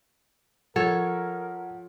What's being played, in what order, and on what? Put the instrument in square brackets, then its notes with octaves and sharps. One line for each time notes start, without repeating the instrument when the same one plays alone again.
[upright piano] F3 G#6 [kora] A4 C#5 [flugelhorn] A#4 [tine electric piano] F#5